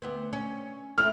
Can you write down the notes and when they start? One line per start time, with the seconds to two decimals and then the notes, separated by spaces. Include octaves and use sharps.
0.02 D2 B3 C4
0.33 C#4
0.98 A3 C4 E4 F6